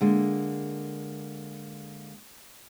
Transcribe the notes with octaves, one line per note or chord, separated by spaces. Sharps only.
D3 G#3 A#3